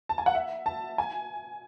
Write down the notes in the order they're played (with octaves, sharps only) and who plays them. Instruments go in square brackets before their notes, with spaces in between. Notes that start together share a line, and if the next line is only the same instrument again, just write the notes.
[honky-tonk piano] A5
G#5
F#5
E5
A5
G#5